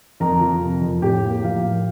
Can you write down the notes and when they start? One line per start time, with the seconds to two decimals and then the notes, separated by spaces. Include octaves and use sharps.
0.20 F2 A#4 A#5
0.41 F3
0.62 C3
0.81 F2
1.02 A2 G4 G5
1.24 A#3
1.43 F3 F5
1.64 A2